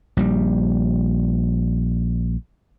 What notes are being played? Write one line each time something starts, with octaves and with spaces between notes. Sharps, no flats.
A#1 G3